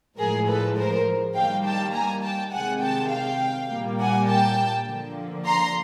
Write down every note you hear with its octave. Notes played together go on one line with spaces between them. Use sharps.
A2 F3 G#3 G#4 A#4
A4 B4
A#4 C5
D#3 G3 A#3 F5 G5
G5 A5
G#5 A#5
G5 A5
C3 D#3 G#3 F#5 G#5
G5 A5
F5 G5
A#2 G3 A#3
F#5 G#5
G5 A5
D3 F3 A#3
A#5 C6